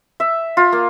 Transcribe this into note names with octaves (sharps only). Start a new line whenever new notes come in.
E5
F4
A#3